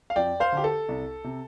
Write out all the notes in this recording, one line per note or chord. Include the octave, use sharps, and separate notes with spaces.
F5
F2 D5 G5
C5 F5
D3 G4
A4
C2
C3